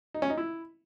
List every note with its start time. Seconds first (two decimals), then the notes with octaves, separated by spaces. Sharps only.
0.14 D#4
0.22 C#4
0.30 D#4
0.38 E4